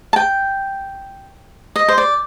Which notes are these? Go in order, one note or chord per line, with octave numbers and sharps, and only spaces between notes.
A5
G5
D#5
C5
D5